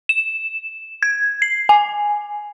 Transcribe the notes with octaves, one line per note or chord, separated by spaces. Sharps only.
E7
G#6
C7
G#5